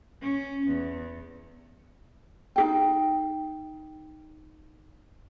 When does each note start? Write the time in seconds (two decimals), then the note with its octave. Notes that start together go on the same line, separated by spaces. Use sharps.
0.22 C#4
0.67 E2
2.56 D#4 G#4 G5